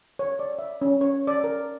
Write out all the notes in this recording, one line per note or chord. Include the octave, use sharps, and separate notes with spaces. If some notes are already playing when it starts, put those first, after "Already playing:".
C#5
D5
E5
C#4
C#5
D5
A#4